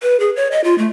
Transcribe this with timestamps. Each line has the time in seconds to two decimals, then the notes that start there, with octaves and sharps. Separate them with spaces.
0.02 B4
0.20 G#4
0.36 C#5
0.52 D#5
0.64 F4
0.78 A3